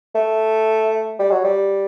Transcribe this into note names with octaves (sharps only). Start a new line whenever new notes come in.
A3
G3
F#3
G3